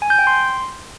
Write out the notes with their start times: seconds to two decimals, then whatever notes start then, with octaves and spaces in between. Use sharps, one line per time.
0.02 G#5
0.10 G6
0.19 G5
0.27 C6